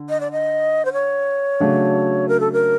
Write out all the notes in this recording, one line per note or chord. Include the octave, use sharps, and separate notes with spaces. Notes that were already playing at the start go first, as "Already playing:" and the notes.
Already playing: D3
D#5
D5
D#5
C5
C#5
C#3 F#3 A3 D4 F#4
A#4
A4
A#4